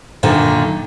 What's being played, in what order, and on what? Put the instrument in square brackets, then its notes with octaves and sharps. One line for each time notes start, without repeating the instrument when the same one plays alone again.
[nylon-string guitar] F#2 A#2 D3 D#3